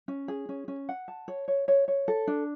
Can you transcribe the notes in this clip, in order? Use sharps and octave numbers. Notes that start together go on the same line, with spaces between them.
C#4
G#4
C#4
C#4
F#5
A5
C#5
C#5
C#5
C#5
A4
D4